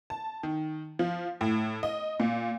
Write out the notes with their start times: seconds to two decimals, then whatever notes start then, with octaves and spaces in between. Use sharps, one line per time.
0.10 A5
0.43 D#3
0.99 F3
1.41 A2
1.83 D#5
2.20 A#2